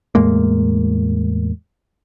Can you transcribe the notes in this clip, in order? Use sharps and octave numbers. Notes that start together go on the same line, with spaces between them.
E2 A2 G#3 A#3